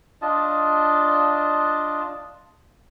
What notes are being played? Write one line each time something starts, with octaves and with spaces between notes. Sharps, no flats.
D4 F4 D#5 A5